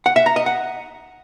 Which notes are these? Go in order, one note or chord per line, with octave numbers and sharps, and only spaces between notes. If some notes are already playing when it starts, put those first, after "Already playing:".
F#5
E5
A#5
D#5
F#5